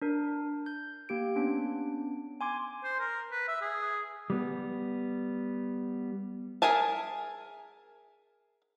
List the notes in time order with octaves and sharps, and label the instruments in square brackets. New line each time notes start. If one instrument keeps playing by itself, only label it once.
[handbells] D4 A#4
G6
A#3 G4 D7
B3 C#4 D4 D7
G#5 C6 D6 G#6
[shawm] C5
A#4
B4
E5
G#4
[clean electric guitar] G3 B3
[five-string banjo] G#4 A#4 E5 G#5 A5